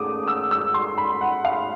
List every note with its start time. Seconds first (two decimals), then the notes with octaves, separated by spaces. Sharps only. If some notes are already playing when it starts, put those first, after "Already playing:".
Already playing: D#2 C#3 A3 D6 D#6
0.28 E6
0.51 E6
0.74 C6
0.98 B5
1.21 F#5
1.45 F5